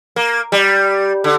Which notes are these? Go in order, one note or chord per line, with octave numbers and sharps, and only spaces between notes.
A#3
G3
D3